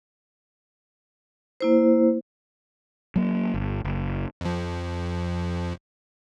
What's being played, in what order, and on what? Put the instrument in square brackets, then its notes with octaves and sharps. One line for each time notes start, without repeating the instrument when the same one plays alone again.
[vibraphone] A#3 E4 C5
[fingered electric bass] F#3 A#3
G1
F#1
[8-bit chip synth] F2 F3